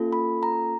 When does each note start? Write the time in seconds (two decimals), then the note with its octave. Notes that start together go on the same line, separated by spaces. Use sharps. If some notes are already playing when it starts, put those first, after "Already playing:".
Already playing: A#3 C#4 F4 A4
0.13 B5
0.43 A#5